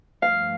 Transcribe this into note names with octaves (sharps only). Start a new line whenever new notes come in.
G2 F3 A3 F5